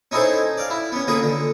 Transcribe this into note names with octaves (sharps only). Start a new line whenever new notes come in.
C#4 D#4 E4 G#4 A4 C5
D5 F5
E4
B3 C#4
D3 A#3 F4 G#4 B4
D3